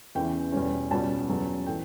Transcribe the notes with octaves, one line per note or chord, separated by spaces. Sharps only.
E2 C#3 E3 G5
E2 B2 G3 C#4
C#2 B2 G3 C#4 A5
E2 C#3 F#3
A2 E3 G5